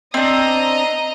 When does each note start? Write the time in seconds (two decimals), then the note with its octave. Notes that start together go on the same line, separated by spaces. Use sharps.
0.14 C4 D4 D#5 A#5